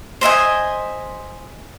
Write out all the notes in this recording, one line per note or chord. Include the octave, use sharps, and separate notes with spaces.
C5 D#5 E5 G#5